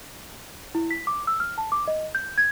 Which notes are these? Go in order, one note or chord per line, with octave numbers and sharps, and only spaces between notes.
E4
B6
D6
E6
F6
A5
D6
D#5
G6
G#6